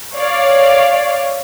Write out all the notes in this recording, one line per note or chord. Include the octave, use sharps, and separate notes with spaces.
C#5 D5 F5